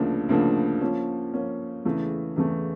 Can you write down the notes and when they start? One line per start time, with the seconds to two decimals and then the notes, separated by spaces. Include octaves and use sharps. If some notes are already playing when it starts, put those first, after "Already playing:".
Already playing: D2 C#3 F3 A#3 D4
0.29 D2 C#3 F3 A#3 D4
0.81 F3 A#3 C#4
1.34 F3 A#3 C#4
1.85 E2 C#3 E3 A3
2.36 E2 C#3 E3 A3